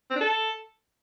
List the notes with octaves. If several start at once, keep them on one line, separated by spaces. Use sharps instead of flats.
C4
D4
A4